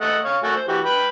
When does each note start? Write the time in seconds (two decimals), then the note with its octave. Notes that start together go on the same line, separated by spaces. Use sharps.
0.01 A3 D#5 F#5
0.25 C#5 F5
0.43 A3 F#4 G#5
0.56 C5
0.68 E3 F#4 G4
0.85 B4 G5 B5